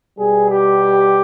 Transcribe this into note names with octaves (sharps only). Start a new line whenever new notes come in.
B2 G3 G#4
G4